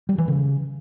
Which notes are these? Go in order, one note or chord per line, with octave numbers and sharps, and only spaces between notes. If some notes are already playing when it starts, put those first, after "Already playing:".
G3
E3
C#3